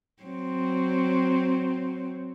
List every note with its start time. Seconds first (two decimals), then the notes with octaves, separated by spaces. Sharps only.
0.23 F#3 C4